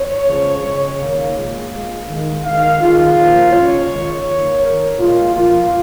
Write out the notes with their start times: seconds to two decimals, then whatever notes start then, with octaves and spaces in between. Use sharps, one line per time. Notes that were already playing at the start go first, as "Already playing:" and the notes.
Already playing: C#5
0.26 C#3 F3 G#3
0.62 C#3 G#3
0.99 D#3 A#3 F5
1.35 A#2 G#3
1.72 A#2 G#3
2.08 D#3 G#3
2.44 D#3 G#3 F5
2.80 D#3 G#3 F4
3.17 A#2 F3 A#3
3.53 C#3 G#3 C#5
3.89 D#3 G#3
4.26 D#3 A#3
4.62 D#3 G#3 A#4
4.98 A#2 G#3 F4
5.35 A#2 F3 A#3 F4